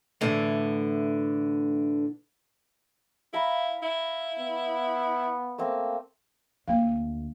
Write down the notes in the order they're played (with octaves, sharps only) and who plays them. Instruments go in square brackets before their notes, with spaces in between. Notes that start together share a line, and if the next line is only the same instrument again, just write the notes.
[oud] A2 D3 E3
[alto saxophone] E4 [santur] F5 A#5 B5
[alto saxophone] E4
[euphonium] B3
[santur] A3 A#3 C4
[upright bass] D2 [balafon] A#3 F5